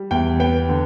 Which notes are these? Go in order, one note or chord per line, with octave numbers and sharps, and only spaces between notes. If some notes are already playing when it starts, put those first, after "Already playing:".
Already playing: G3
E2 G5
B3 G5
D3